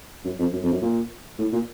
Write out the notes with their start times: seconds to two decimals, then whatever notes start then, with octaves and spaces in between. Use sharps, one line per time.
0.25 F#2
0.39 F2
0.53 F#2
0.63 F2
0.72 F#2
0.82 A#2
1.38 A2
1.53 A#2